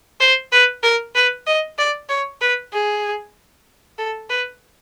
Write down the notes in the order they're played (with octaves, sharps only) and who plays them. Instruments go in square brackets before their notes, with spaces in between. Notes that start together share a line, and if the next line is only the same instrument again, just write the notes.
[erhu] C5
B4
A#4
B4
D#5
D5
C#5
B4
G#4
A4
B4